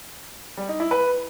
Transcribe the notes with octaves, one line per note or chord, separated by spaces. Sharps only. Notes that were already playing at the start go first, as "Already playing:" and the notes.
G3
D#4
E4
B4